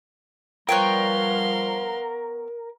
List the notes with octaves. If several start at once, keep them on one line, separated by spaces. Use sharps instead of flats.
F3 G3 B3 A#4 C#5 F5 G5 C6